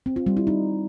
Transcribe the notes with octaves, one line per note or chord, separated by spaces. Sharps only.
C4
F4
G3
E4
D#4